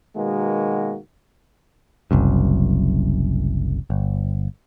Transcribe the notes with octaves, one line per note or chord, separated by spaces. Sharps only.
B2 D#3 G#3 A#3 B3 F#4
F#1 C2 F#2
G1